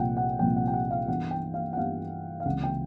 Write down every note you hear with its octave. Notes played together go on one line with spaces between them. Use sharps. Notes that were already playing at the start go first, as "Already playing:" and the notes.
Already playing: C2 A#2 F3 F#5 G5
F#5
C2 A#2 F3 G5
F#5
G5
F#5
F5
G2 E3 G3 B3 F#5
G5
F5
F#5
G2 E3 G3 B3 F5
F5
C#2 C3 E3 F#5
G5